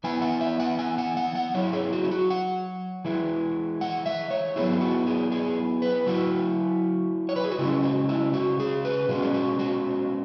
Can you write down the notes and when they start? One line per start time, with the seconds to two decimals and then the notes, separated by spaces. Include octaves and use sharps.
0.04 E3 B3 E4 G#5
0.22 F#5
0.41 E5
0.60 F#5
0.79 G#5
0.98 F#5
1.17 F#5
1.35 F#5
1.54 F#3 E4 C#5
1.73 G#4
1.93 F#4
2.04 E4
2.11 F#4
2.30 F#5
3.05 E3 G#3 E4
3.81 F#5
4.06 E5
4.31 C#5
4.56 F#3 B3 E4 G#4
4.81 F#4
5.07 G#4
5.32 G#4
5.82 B4
6.07 F#3 E4 F#4
7.29 C#5
7.36 B4
7.44 G#4
7.51 F#4
7.59 C#3 G#3 C#4 E4
7.83 F#4
8.09 E4
8.34 F#4
8.60 G#4
8.85 B4
9.09 B2 G#3 C#4 F#4
9.22 G#4
9.34 F#4
9.59 F#4